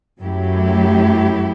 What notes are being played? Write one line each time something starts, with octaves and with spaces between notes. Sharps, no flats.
F#2 F#3 A3 E4 G4